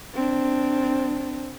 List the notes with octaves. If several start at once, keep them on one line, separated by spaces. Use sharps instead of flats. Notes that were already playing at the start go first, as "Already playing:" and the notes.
C4 D4